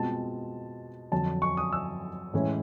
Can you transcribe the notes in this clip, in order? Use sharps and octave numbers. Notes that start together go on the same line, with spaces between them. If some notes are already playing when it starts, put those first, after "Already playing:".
Already playing: B2 G#3 C4 F4 A5
F2 D3 F#3 A5
C#6
D#6
E6
A2 E3 G#3 C#4 E4